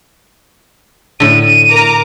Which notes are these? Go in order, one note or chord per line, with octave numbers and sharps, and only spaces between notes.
A2 D3 D#7
A#4 A#5 D6